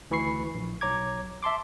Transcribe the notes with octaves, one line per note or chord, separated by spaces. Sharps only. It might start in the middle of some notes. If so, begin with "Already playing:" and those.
D2 E3 B5 C#6 C7
A#1
B1 C#5 A#5 D6 G#6
E5 A5 C6 D6